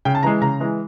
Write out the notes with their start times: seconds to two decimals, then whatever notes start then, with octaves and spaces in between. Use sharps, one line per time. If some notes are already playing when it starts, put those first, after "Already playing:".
0.05 C#3 G5
0.15 A5
0.23 E3 G#3 A#5
0.41 C#3 A#5
0.60 E3 G#3